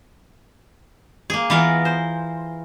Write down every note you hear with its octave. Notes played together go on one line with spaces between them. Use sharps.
A#3 G#4
E3 B3 F4 A#4 F5
C5